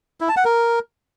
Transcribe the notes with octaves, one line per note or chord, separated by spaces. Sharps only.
E4
A5
F#5
A#4